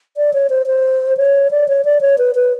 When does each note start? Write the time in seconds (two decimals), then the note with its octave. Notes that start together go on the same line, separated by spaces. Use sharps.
0.17 D5
0.33 C#5
0.50 C5
0.66 C5
1.17 C#5
1.51 D5
1.68 C#5
1.85 D5
2.01 C#5
2.18 B4
2.35 B4